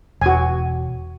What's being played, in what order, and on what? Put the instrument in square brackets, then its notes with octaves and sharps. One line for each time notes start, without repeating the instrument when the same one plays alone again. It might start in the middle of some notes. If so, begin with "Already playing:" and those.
[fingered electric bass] E1 [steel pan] F#4 G#5